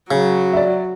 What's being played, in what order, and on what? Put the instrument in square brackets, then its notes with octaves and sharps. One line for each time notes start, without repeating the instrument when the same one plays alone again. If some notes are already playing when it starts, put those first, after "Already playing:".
[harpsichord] C#3 [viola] F#3
[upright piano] D5 E5